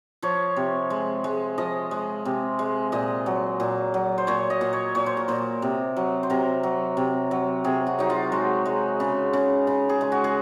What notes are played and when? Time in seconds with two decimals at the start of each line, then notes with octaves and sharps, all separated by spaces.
0.22 F3 C#5
0.56 C3
0.90 G#3
1.24 G#3
1.58 F3 D#5
1.91 G#3
2.25 C3
2.59 G#3
2.92 A#2 D#5
3.26 F#3
3.60 A#2
3.94 F#3
4.18 C5
4.27 A#2 C#5
4.50 D#5
4.61 A#2
4.73 C#5
4.95 A#2 C#5
5.06 C5
5.17 A#4
5.28 A#2 C5
5.62 C3
5.96 F#3
6.23 C5
6.30 C3 A#4
6.63 F#3
6.97 C3
7.31 F#3
7.64 C3 G#4
7.87 F#4
7.99 F#3 D#4
8.10 F4
8.32 G#3 F#4
8.66 G#3
9.00 C#3
9.33 C#3
9.67 C#3
9.89 G#4
10.01 G#3
10.12 F#4
10.24 G#4